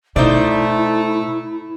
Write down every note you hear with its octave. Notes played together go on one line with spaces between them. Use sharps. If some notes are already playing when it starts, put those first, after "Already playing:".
B2 A3 D#4 E4 C5 D5